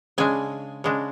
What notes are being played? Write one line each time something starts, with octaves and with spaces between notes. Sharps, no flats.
C#3 G#3 D4 G#5
C#3 G#3 D4